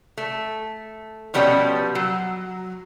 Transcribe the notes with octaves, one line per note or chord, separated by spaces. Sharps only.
A3
B2 F3 G3 B3 C#4 A5
F#3